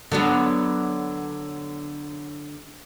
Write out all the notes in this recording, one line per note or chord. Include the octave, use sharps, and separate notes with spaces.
D3 F#3 B3